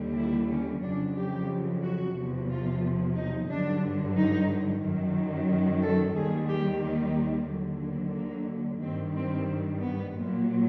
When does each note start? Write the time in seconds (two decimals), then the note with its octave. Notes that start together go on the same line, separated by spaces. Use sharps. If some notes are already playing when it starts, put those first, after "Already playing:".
Already playing: D#2 D3 G3
0.17 E4
0.51 C#4
0.84 F2 C#3 F#3 D4
1.17 G4
1.83 F#4
2.16 E2 C3 F3
2.50 F4
3.16 D#4
3.50 G2 D3 F#3 D4
4.16 D#4
4.82 F#2 D#3 F#3
5.83 A4
6.16 D#2 D#3 G3 G#4
6.49 G4
6.83 D#4
7.49 D#2 D3 F#3
7.82 A#3
8.15 A#3
8.82 G2 D#3 G3 C4
9.14 C4
9.82 B3
10.15 A#2 F#3